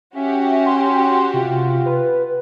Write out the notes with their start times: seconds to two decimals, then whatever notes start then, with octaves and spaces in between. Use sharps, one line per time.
0.16 C#4 F#4 G4 E5
0.66 C6
1.34 C3 F4
1.86 B4